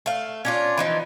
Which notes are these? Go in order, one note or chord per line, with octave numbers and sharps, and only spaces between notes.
A3 F5
C#4 D4 F4
E3 F3 D#4